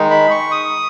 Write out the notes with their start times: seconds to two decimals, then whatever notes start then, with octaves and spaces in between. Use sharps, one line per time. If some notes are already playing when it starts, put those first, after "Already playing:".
Already playing: D#3 G#3 D#4
0.10 B5
0.30 C#6
0.51 D#6